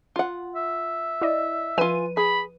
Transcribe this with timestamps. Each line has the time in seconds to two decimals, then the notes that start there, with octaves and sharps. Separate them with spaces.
0.16 F4 F#5
0.56 E5
1.21 E4 D5 D#5
1.78 F3 F4 B4 G#5 D#7
2.17 G#4 B5